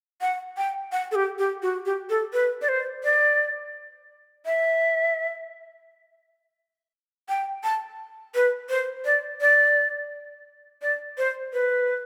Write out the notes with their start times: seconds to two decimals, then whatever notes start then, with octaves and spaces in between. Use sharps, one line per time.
0.21 F#5
0.57 G5
0.92 F#5
1.11 A4
1.15 G4
1.39 G4
1.63 F#4
1.86 G4
2.10 A4
2.33 B4
2.62 D5
2.68 C5
3.04 D5
4.46 E5
7.29 G5
7.64 A5
8.35 B4
8.70 C5
9.05 D5
9.41 D5
10.82 D5
11.18 C5
11.53 B4